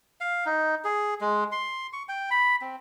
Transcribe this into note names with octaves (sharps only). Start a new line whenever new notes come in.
F5
D#4
G#4
G#3
C6
C#6
G5
B5
C4